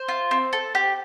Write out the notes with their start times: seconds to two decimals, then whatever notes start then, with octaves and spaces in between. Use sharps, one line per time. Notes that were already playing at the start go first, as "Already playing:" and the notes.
Already playing: C5
0.08 F4
0.31 C4
0.53 A4
0.75 G4